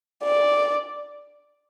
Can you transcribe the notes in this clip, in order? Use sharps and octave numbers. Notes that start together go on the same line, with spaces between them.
D5